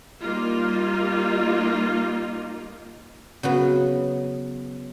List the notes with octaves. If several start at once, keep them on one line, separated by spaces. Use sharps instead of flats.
G3 A#3 D#4 F4
C#3 F#3 B3